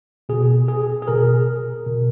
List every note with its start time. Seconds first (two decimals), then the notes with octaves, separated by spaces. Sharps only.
0.29 B2 G#4
0.68 G#4
1.02 G#4
1.08 B2 A#4
1.86 B2